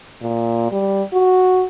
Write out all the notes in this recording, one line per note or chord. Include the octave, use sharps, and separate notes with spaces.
A#2
G3
F#4